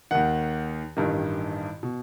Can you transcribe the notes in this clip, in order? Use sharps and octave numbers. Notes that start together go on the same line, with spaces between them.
D#2 D#3 F#5
A1 G2 D#3
B2